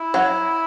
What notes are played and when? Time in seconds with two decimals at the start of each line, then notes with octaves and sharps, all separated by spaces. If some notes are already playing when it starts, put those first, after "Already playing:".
Already playing: E4
0.14 F#3